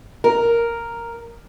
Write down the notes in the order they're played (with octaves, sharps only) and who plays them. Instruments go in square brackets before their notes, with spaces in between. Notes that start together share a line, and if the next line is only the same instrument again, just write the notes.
[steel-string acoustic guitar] A#4